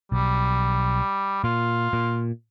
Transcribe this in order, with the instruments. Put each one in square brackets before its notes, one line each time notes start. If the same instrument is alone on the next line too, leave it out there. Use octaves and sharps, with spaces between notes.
[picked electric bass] B1 [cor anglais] G3
[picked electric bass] A#2 [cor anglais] F4
[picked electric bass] A#2